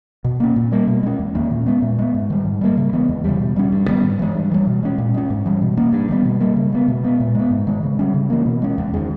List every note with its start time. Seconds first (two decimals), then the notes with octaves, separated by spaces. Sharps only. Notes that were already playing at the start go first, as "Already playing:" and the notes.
0.24 B2
0.40 A#3 C#4
0.56 A#2
0.72 G3 A#3
0.87 B2
1.03 G#3 C#4
1.19 E2
1.35 D#3 A#3 C#4
1.51 A#2
1.66 G#3 B3
1.82 A#2
1.99 G#3 B3
2.14 G#2
2.30 D#3 G3
2.45 G#2
2.61 G3 A#3
2.77 C#3
2.93 E3 G#3 B3
3.09 E2
3.24 C#3 E3 G3
3.40 B2
3.56 G3 C#4
3.72 G2
3.88 D#3 G3 B3
4.04 G#2
4.19 E3 G#3
4.35 G2
4.52 E3 G3
4.67 B2
4.83 G#3 C#4
4.98 A#2
5.14 G#3 C#4
5.30 G#2
5.46 E3 G3
5.62 B2
5.77 A#3 C#4
5.93 G2
6.09 D#3 G3 B3
6.25 B2
6.40 G3 A#3
6.56 C#3
6.72 G#3 B3
6.88 B2
7.04 G#3 B3
7.20 A#2
7.35 G#3 B3
7.51 G#2
7.67 D#3 G#3
7.83 C#3
7.99 G3 C#4
8.14 C#3
8.30 E3 A#3
8.45 B2
8.62 G#3 C#4
8.78 E2
8.94 D#3 G#3